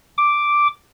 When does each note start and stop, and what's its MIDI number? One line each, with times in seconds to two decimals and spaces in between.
0.18 0.68 86